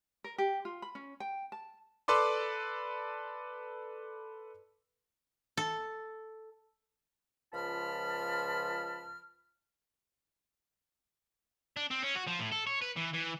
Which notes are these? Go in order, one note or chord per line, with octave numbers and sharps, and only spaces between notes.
A#4
G4
F4
B5
C#4
G5
A5
A4 B4 D5 C6 D6
A4
C#2 F3 F4 A5 B5 F6
D4
C4
C#4
F#4
F3
A2
A4
C#5
B4
E3
E3